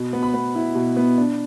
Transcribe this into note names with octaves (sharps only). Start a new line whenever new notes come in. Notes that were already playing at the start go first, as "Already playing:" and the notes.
Already playing: B2
B3
B5
B3
E4
B2
B3
D4